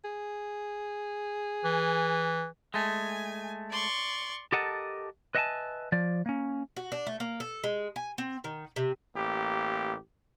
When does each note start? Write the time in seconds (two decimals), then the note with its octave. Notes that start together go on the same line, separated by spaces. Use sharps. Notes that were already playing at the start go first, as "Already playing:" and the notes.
0.04 G#4
1.65 E3
2.74 G#3 A3 G#5
3.72 D5 C6 C#6
4.52 G4 A4 A#4 D#5 F#5 A5
5.35 B4 D#5 E5 F#5 G#5 A5
5.92 F3 D5
6.26 A#3 C#4
6.77 F#4
6.92 D4
7.07 A3
7.20 A#3
7.40 A4
7.64 G#3
7.96 G#5
8.18 C4
8.44 D#3
8.76 C3
9.16 A1 A#3 G4